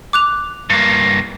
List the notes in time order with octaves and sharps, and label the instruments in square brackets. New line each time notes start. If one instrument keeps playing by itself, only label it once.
[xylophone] D6 F#6 F7
[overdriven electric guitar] G2 A#3